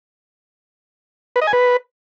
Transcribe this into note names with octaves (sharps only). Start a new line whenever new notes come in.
B4
D#5
G#5
B4